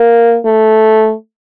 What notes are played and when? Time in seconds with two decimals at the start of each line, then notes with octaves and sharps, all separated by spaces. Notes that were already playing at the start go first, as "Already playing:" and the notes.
Already playing: A#3
0.46 A3